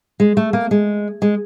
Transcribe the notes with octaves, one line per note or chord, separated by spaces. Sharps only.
G#3
A3
A#3
G#3
G#3